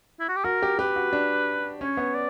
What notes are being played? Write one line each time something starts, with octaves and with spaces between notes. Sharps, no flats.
E4
F#4
G4
F#4 A#4
G4
G4 B4
F#4
D4
C#4 C#5
B3
D5